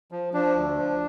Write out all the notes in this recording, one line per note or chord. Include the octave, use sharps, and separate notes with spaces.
F3
F3 D4
D2
F3